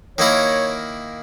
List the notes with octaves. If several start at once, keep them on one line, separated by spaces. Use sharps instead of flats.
D#3 A#3 E4 A#4 C#5